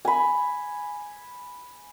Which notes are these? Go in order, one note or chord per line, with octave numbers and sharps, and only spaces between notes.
G#5 B5